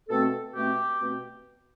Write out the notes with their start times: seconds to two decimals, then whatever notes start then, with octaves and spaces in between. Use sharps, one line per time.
0.09 B2 A3 C4 A4
0.54 B2 A3 C4 G4
0.98 B2 A3 C4